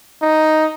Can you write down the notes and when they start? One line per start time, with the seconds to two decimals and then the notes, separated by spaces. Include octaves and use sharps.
0.22 D#4